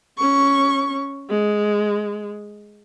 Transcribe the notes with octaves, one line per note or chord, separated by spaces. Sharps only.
C#4 C#6
G#3